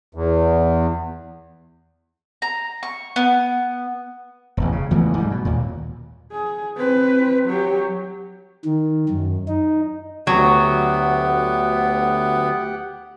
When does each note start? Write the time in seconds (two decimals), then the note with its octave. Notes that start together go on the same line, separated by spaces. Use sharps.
0.15 E2
2.42 A#5
2.83 C#6
3.16 B3
4.57 E1 A1
4.72 C#3
4.91 C#2 E3 A3 B3
5.18 G#2 G3
5.31 B2
5.45 D#2 A#2
6.32 G#4
6.76 C4 B4
7.47 F#3 G4
8.65 D#3
9.09 F#2
9.48 D#4
10.27 D2 F#3 B3 G4 F#5